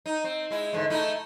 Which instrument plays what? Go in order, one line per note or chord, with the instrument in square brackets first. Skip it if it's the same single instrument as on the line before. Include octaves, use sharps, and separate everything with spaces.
[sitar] D#4
C4
G#3 E4
E2 G#2 D3
A3 D#4 E4